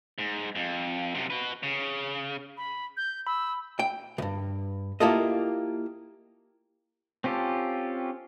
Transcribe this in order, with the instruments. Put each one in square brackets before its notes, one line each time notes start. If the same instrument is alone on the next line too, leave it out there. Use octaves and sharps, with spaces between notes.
[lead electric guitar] G#2
F2
F#2 C3
F#4 B4
C#3
[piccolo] B5
G6
[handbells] B5 [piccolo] E6
[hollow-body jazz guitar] G5
C2 G2
A#3 E4 F4 G4 A4 D#5
[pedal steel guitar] C4 C#4 F4 G4 A4